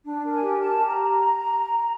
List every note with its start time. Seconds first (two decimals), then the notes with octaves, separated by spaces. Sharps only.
0.05 D4
0.23 A#4
0.33 G#5
0.41 G4
0.60 A#4 A5
0.78 G4
0.87 A#5